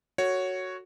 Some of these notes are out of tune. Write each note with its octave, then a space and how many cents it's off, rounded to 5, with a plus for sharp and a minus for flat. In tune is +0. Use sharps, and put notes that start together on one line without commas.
F#4 +0 A4 +40 C#5 +0